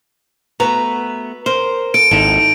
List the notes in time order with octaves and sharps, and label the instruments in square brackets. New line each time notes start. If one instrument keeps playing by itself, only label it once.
[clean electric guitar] A3 B3 F#4 [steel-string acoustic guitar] B4 A#5
[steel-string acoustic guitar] A#4 [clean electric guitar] C5
[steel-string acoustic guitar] A4 [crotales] D7
[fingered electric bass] G#1 [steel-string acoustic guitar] D#2 [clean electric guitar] D#4 E4 A4